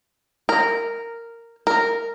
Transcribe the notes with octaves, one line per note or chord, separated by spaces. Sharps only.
A#4
A#4